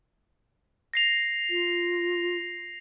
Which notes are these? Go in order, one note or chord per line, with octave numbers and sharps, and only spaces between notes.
A#6 C7 F7
F4